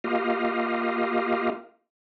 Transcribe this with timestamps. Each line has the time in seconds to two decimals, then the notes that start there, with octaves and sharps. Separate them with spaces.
0.04 A#3 F4 G4 D#5 F5